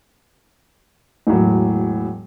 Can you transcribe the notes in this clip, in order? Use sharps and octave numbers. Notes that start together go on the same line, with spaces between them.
E1 A2 F#3